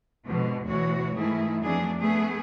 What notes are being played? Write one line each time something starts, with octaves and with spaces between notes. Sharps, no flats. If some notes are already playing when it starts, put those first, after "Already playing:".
G#2 B2 D3 F3
D2 B2 E3 F#4 C#5
G#2 D#3 E3 A3 E4 G#4
F2 F#3 A3 B3 D4 G#4
A3 B3 G#4